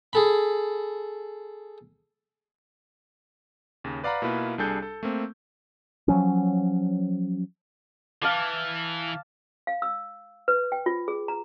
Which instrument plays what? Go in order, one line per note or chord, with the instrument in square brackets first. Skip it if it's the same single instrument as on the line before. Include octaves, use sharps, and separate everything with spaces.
[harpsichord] G#4 A4 B5
[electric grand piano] D#2 C#3
B4 D5 F5 F#5 A#5 B5
B2 A#3 E4 F4 B4
C2 G3 D4 G#4 A4 G6
A4
A3 A#3 C4
[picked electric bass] F3 F#3 C#4
[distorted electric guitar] E3 [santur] F5 A5 D6
[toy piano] F5
E6
B4
G5
F4
G#4
A#5